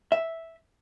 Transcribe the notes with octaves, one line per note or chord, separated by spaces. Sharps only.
E5